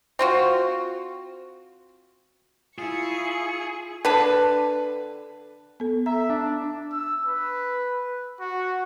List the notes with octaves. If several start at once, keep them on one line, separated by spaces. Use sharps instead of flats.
C4 F4 F#4
E4 F4 G#4 C#6 C#7
D3 B4
B3 A4
E5 A#5
D4
E6
B4
F#4